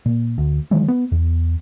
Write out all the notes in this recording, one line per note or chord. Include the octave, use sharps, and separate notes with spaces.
A#2
D2
D#3 E3 F#3 G#3
B3
E2